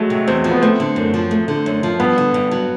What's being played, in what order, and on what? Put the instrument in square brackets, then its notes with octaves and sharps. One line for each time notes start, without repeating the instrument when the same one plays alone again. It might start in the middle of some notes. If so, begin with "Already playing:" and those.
Already playing: [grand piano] F#3 G#3 A3
[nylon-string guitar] C3
[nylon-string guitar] E2 [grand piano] C4
[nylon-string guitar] F3
[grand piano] B3
[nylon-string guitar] A3 [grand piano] C4
[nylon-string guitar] D3
F#2
F3
A3
D3
F#2
F3
[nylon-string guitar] G2 [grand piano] B3
[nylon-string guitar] D3
G2
F#3